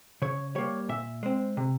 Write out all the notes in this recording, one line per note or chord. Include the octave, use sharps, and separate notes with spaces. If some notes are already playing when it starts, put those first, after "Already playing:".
C#3 C#5
G3 A#3 C#5
A#2 E5
G#3 C4
C3